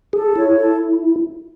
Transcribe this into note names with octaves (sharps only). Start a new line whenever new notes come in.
G#4 A4
E4 C#5
A4